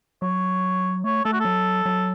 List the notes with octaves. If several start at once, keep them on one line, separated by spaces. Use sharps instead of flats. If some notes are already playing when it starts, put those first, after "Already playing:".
F#3 C#5
A3 C#5
A3 A4
F#4
F#3 A4
F#3